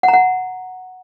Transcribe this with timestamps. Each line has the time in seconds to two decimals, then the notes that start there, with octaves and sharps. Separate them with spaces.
0.03 F#5
0.08 A#5
0.13 F#5